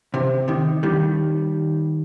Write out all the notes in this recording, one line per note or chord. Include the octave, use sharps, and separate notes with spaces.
C3
C3 D#3
D#3 G3